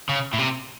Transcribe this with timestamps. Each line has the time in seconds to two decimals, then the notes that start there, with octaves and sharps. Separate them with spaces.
0.09 C#3
0.33 A2
0.38 C3